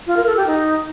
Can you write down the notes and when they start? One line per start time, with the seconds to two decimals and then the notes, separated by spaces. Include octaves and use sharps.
0.07 F4
0.17 A#4
0.27 A4
0.37 G4
0.47 D#4